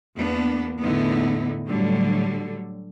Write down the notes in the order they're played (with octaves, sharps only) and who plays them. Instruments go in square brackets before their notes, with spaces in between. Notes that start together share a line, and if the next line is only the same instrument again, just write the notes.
[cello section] E2 A#3 B3 D4
E2 A2 D3 B3 D#4 E4
A2 D3 F#3 G3